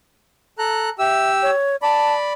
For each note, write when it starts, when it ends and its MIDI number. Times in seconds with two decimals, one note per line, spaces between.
0.59 0.89 69
0.59 0.89 82
0.59 0.89 90
0.99 1.51 67
0.99 1.31 76
0.99 1.51 88
1.42 1.76 73
1.82 2.33 74
1.82 2.14 81
1.82 2.33 83